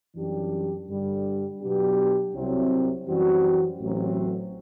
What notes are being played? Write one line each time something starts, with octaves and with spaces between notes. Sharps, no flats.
F#2 E3 G3 D4 G4
G2 D3 G3
B2 F#3 B3 D4 G4
C2 C3 F#3 C4
F#2 E3 G3 C4 F#4
A1 A2 F#3 C4